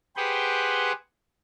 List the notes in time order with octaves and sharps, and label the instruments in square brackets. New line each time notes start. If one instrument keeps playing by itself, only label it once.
[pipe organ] G4 G#4 B4 C5 F#5 G5